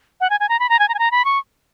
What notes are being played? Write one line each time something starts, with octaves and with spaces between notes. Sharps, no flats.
F#5
G#5
G#5
A#5
B5
A#5
G#5
A#5
G#5
A#5
B5
C#6